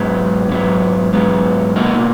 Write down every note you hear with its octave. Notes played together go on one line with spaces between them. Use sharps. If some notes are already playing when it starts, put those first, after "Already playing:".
Already playing: G#2 F#3 B3
G#2 F#3 B3
G#2 F#3 B3
B2 A#3 D#4 F#4